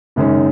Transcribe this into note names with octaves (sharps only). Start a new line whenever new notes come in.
F#1 F#2 D#3 G#3 C#4